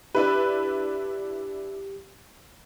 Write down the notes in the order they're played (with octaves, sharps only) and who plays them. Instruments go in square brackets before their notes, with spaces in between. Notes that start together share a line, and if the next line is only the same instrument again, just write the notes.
[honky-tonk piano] D4 E4 B4 [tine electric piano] G4